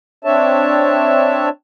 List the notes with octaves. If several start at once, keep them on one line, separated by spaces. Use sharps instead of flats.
C4 D4 C#5 E5 A5